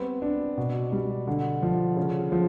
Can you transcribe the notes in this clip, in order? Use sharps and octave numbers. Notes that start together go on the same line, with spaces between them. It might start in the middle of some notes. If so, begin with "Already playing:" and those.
Already playing: G3 B3 C4
D4
B2
G3
D3
F3
C#3
F3